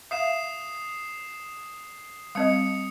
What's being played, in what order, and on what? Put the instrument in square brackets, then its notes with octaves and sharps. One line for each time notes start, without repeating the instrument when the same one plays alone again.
[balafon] E5 F5 [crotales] D#6 C7 E7
[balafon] G3 C4 D#5 [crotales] D#6 C#7